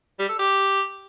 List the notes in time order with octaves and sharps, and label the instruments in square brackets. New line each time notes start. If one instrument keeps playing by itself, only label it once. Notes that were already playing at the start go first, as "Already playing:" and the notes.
[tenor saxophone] G3
A4
G4